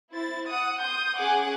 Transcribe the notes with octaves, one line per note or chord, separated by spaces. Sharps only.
E4 C5 A6
F#5 D#6
C6 D#6 G6
C#4 G#4 F#5 G#5 D6